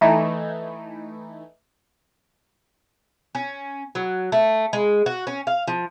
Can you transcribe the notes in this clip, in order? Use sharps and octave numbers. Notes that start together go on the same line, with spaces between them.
E3 A3 D#4 E4
C#4
F#3
A3
G#3
F#4
C#4
F5
F3